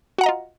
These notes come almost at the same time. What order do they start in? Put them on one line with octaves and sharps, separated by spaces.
F#4 F#5 A#5 D#5 F4